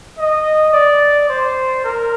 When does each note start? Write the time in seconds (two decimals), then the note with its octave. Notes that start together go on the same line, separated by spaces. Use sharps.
0.18 D#5
0.73 D5
1.29 C5
1.85 A#4